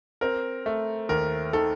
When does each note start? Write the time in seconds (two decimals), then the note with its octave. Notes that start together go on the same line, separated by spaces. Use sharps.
0.21 C4 A#4
0.66 A3
1.09 D#2 A#4
1.53 D#3 A4